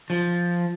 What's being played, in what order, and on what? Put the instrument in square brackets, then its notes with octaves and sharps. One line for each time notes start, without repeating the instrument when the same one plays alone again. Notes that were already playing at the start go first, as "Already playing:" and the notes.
[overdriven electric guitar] F3